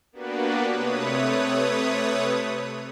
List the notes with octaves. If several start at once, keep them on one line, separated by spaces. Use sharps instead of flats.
A#3 B3 D4 F#4 G4 B4
C3 A3 B4 C#5 D#6